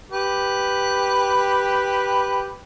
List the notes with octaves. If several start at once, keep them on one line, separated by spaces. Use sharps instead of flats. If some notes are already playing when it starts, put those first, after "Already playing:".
G4 B4